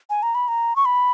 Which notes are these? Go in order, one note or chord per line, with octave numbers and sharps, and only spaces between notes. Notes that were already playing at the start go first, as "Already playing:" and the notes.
G#5
A#5
B5
A#5
C#6
B5